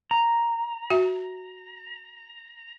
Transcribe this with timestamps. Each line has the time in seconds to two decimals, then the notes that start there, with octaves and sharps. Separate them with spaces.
0.11 A#5
0.90 F#4 E5